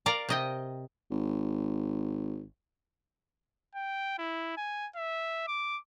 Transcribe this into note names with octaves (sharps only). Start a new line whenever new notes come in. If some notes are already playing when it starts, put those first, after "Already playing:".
A#4 D5 F5 A#5
C3 D#5 G5
G#1
G5
E4
G#5
E5
D6